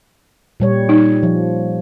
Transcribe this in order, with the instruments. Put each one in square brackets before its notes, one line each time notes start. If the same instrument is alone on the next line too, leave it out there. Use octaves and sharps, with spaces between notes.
[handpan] A#2 G3 C#5
[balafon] D#4
[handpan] F3